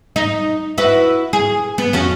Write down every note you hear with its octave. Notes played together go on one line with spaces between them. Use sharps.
D#4
E4 F#4 B4
G#4
B3
F2 C#4 F#4